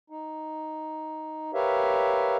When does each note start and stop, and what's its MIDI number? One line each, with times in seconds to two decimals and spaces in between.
0.10 1.51 63
1.54 2.37 67
1.54 2.37 70
1.54 2.37 71
1.54 2.37 73
1.54 2.37 76
1.54 2.37 77